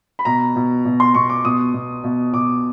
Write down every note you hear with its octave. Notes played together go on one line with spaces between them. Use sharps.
B5
B2 A#5
B2
B2
C6
B2 C#6
D6
B2 D#6
B2
B2
B2 D6